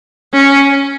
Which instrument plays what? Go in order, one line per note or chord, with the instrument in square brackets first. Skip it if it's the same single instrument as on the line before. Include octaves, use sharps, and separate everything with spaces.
[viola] C#4